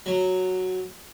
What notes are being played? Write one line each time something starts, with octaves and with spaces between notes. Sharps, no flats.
F#3